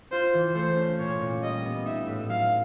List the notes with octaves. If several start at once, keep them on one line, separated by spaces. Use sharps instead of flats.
F4 C5
E3
A3 C5
C#4
A#2 C#5
A#2
G3 D#5
B3
D#4 E5
A2
F#3 F5